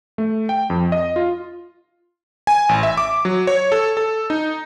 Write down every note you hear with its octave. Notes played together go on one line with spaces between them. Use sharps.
A3
G5
F2
D#5
F4
G#5
A1
E5
D6
F#3
C#5
A4
A4
D#4